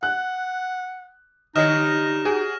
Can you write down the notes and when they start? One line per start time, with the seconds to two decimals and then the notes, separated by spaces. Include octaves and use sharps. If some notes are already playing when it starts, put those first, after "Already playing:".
0.03 F#5 F#6
1.56 D3 G3 D#4 C#5 D#5 F6 A#6 E7
2.25 F#4 G#4